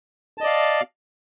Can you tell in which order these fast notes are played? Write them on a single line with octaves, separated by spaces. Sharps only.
A5 D#5 D5 F5